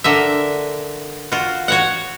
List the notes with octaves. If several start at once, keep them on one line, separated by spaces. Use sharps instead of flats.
D3 A#4 E5
F4 F#4
F#4 C#5 F#5